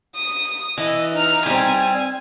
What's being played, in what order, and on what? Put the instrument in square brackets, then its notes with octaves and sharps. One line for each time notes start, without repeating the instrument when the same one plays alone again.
[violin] D#6
[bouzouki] E3 [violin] D#5
[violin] D#4 F6
[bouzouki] G3 C4 [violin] G#5